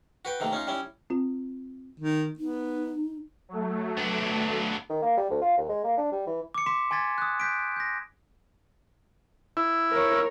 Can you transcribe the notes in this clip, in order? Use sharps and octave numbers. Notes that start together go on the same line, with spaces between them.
F#4 B4 G5
C3 D#3 A3 A#3
C#4 D#4 F4
G3 C#4 E4
C4 F4
D#3
B3 D#4
F#3 A3
B3 D4
D#3
A#3
G3
D2
F4
D#2
G#3
A#3
D4
G3
E3
D6 C#7
C6 D6 B6 E7
G#5 C6 G#6 A6 B6 D#7
D#6 F#6
F#6 G6 B6 D7
G6 A#6
E4
A#4 C#5